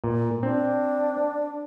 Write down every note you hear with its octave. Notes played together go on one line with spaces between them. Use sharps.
A#2
C4 D4